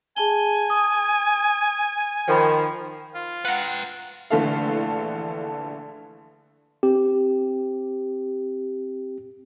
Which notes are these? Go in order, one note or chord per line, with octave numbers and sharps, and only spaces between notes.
G#4 G#5 A5 G7
D#6
D#3 F3 G5 B5
F4
B4 F#5 G5 A#5
A#1 D3 E3 A3 A4 F5
C4 G4